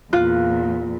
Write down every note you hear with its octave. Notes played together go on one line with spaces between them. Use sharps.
E2 A#2 F4 F#6